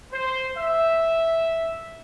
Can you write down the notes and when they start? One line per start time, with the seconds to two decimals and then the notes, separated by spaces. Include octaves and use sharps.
0.13 C5
0.57 E5